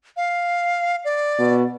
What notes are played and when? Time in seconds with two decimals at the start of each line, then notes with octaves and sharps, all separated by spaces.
0.17 F5
1.05 D5
1.39 B2